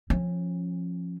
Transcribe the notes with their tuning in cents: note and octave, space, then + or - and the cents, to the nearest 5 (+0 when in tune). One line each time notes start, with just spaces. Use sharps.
F3 +0 C#4 -25